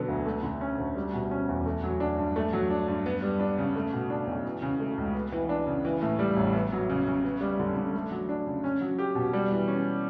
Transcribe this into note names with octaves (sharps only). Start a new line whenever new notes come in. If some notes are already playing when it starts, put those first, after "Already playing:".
Already playing: B2 D3 F#3 B3
D2
A3
D3
C#4
D2
G3
B2
C#4
E2
A3
F#3
D4
G2
A3
F#3
D4
G2
B3
G3
D4
C#3
A3
B2
D4
B1
E3
C#3
A3
C#2
B3
E3
D4
C#3
E3
A2
G3
A1
B3
F#3
C#3
C#3
B3
G3
D3
D3
A3
F#3
D4
C#3
C#4
F#3
G4
B2
G3
E3
C#4